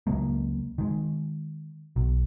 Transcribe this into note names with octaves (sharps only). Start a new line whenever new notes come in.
C#2 F#3 G#3 A#3
D#3 G#3
B1